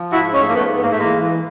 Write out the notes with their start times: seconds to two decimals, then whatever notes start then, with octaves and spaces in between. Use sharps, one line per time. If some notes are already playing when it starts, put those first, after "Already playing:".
Already playing: F3
0.13 G#2 E4 F#4
0.34 F3 C#4 D#4
0.42 A3
0.49 A#3
0.55 G#2 A3 B3
0.77 A2 B3
0.84 A#3
0.92 A3
0.98 E3 G#3 A#3
1.21 E3